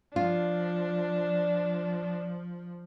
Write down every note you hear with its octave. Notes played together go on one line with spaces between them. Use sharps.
F3 D4 F4